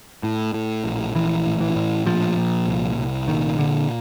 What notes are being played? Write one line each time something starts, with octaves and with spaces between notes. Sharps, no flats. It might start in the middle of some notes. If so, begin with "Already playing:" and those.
A2
A2
A#1
A#1 E3
A2
E3
A2
A#2 F3
A#2
C2
C2
A#2 D#3
A#2 D3